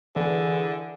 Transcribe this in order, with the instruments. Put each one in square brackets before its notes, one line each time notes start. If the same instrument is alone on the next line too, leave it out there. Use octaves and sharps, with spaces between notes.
[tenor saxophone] D3 [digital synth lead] E3 [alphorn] G#4